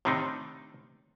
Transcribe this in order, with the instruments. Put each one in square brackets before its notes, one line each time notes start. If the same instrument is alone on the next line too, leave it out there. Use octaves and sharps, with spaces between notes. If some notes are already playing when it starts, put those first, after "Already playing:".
[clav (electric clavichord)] A2 C3 D#3 C4 D4 D#4